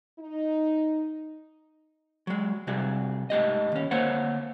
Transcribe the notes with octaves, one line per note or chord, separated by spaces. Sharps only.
D#4
F#3 G#3
C3 G3 F#4 G#4
G#2 A3 G4 D#5
D#2 C#4
D2 A#3 C5 C#5 F#5